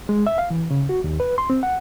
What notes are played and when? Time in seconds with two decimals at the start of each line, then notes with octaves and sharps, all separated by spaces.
0.09 G#3
0.27 E5
0.38 F5
0.50 E3
0.71 C#3
0.89 F#4
1.04 D#2
1.20 B4
1.38 C6
1.50 C4
1.63 F#5